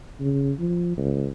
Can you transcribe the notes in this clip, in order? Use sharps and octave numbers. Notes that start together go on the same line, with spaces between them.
C#3
F3
C#2